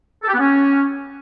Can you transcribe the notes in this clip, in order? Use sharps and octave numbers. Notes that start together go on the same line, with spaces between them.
A4
G4
B3
C#4